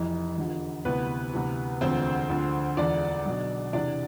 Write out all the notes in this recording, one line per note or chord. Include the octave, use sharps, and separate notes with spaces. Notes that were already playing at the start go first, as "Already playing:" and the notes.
Already playing: F1 F2 E3
F1 E2 D3 F3
D2 C3 E3 B3 B4
D2 C3 E3
E1 D2 D3 F3 C4 C5
D2 D3 F3
E1 E2 D3 F3 D4 D5
B1 B2
E2 C3 E3 D4 D5